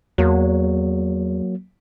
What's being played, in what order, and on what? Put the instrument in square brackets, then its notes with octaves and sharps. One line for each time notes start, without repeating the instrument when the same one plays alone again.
[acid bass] E2 [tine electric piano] F#3 A#3